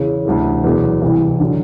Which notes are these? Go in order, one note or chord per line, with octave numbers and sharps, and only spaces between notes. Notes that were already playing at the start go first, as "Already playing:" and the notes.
Already playing: E2 C#3 E3
D2 C3 E3
E2 B2 F#3 B3
C2 C3 E3
D3 F#3